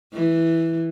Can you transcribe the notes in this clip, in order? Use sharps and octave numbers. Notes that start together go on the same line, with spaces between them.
E3